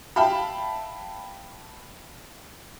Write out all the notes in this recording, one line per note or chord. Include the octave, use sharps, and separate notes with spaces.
E5 F5 G5 A5 B5